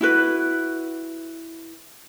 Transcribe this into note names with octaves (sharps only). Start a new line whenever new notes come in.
E4 F#4 B4